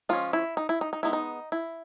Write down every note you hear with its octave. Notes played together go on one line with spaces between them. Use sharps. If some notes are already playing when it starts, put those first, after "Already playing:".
F3 G#3 C#4 F4
E4
D#4
E4
D#4
D#4
G#3 B3 D#4 E4
D#4
E4